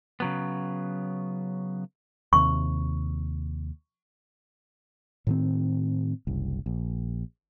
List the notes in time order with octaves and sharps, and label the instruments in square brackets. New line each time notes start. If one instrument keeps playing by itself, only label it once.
[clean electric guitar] C#3 F#3 B3
[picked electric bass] D#2 C3 [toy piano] C#6
[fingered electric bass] A2 D#3 C4
F#1 C2
A#1